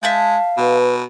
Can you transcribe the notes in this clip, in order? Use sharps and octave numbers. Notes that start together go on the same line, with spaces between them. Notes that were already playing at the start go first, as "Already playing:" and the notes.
G#3 E5 F5 A5 G6
B2 B4